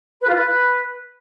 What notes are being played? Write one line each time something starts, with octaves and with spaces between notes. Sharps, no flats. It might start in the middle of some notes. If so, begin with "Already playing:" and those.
B4
F4
B4